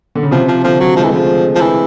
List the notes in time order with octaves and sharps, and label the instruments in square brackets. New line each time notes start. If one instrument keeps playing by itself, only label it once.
[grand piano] D3
C#3
[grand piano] C3 [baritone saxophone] F3
[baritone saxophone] F3
[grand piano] D3 [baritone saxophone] F3
[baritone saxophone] F#3
[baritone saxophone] F3 [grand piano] G#3
[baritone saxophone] E3 [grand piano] A3
[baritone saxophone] F3
[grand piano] G#3
[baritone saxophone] F3
E3